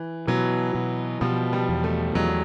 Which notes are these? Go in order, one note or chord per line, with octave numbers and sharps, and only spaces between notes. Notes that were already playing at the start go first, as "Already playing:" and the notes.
Already playing: E3
B2 E3 F#3
B2
B2 F3 G3
F3 G3
E2
G3 A3
E2 F#3 G#3